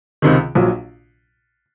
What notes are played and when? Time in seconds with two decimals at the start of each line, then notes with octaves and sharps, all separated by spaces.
0.22 C#2 C3 D#3
0.55 A#1 A#2 F#3